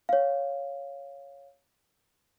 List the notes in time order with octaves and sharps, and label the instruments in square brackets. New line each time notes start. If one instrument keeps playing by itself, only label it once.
[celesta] C#5 F5